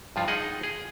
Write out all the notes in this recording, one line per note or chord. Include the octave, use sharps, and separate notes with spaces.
G2 F3 F4
D#4 G#4 D#5 F#5
G#4